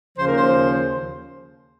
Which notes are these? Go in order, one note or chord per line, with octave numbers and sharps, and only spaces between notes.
D#2 C#3 F3 C5
A#4
C5